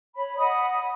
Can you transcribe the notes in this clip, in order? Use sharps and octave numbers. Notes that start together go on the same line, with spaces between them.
C#5 B5
D#5 F#5 B5 D#6